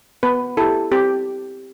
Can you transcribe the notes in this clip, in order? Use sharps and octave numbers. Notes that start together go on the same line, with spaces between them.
B3 B4
E4 G4 A4
C4 G4